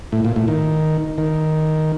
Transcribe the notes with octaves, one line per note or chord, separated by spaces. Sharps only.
A2
A#2
A2
D#3
D#3